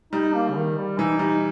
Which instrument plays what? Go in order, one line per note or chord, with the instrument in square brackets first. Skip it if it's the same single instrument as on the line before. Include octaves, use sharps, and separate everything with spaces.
[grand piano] G3 [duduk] D#4
[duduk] A#3
C#3
D#3
G3
[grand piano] E3 [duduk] D#4
[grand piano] G3 [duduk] D#4